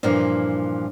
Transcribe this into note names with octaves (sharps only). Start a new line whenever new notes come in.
G2 A#2 E3 F3